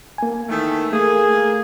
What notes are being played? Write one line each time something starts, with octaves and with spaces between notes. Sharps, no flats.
A#3 G#5
D#3 E3 A3
A3 A#3 G#4